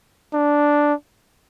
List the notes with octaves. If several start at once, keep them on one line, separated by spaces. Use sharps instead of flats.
D4